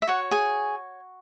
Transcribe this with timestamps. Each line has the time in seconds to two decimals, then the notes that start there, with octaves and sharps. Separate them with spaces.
0.02 E5
0.07 F#4 C#5 F#5
0.31 G#4 G#5